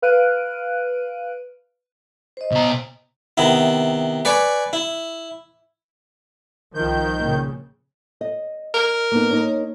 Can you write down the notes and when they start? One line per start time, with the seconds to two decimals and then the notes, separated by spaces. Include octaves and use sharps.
0.02 B4 F5 F6 F#6 D7 D#7
2.37 C5 D#5
2.52 B2 A#5
3.37 C3 D#3 B3 E4
4.25 B4 D5 G#5 C#6
4.73 E4
6.75 C2 D#3 F3 G6
7.17 A#2 C#3
8.21 D#5
8.74 A#4
9.12 A#3 B3 D#4
9.31 A#3 D#4 C#5